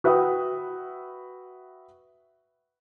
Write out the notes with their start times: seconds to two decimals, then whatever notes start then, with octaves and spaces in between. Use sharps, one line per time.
0.04 F#4 B4 E5 F#5 G5 D#6